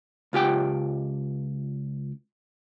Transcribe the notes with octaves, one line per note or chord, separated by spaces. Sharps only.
C#2 F4 G4 G5